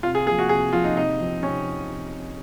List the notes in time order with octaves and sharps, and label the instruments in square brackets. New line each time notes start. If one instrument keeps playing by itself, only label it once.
[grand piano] C3 [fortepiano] F4
[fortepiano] G#4
[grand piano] A#3 [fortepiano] G#4
[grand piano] F3
[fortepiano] F#4
[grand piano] C3 [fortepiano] G#4
[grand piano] F3 A#3 [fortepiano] F4
[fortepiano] D#4
[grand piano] C3 [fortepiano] D#4
[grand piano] F3 C4 D#4
[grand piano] C3 [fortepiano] C#4